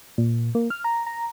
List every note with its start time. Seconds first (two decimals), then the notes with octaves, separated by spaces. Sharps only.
0.18 A#2
0.55 A#3
0.70 F6
0.84 A#5
1.07 A#5